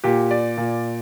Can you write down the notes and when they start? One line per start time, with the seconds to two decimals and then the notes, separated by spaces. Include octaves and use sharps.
0.04 A#2 G4
0.31 D5
0.57 A#2